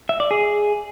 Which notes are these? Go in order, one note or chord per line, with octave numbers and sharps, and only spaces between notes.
E5
D5
G#4